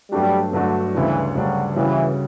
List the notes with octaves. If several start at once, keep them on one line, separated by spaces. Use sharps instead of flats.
G2 F#3 G3 A3 D4 F#4
G2 D3 F#3 A3 D4 F#4
D2 C#3 E3 G3 D4
D2 C#3 F#3 G3 D4
C#3 E3 G3 C#4 F#4